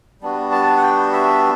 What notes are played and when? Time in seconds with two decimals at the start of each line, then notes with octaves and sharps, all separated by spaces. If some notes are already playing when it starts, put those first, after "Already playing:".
0.21 G3 B3 D4 F#4
0.52 A5
0.77 F#5
0.83 G5
1.13 E5